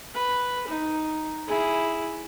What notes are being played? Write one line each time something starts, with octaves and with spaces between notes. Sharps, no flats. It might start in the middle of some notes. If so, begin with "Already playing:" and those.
B4
D#4
E4 G#4